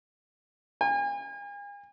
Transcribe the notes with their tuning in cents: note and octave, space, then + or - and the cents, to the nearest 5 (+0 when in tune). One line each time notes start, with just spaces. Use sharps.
G#5 -40